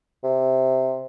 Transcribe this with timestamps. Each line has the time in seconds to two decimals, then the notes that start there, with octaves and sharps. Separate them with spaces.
0.24 C3